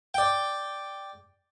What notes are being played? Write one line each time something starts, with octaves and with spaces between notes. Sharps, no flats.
D5 G5